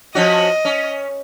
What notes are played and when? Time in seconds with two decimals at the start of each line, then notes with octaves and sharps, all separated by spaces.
0.15 F3 C#4 F#4 D#5
0.65 C#4